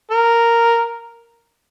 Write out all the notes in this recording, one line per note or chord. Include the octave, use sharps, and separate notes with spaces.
A#4